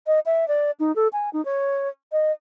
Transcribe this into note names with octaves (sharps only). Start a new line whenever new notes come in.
D#5
E5
D5
D#4
A4
G#5
D#4
C#5
D#5